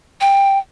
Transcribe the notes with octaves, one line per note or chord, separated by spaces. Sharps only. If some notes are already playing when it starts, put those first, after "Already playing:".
G5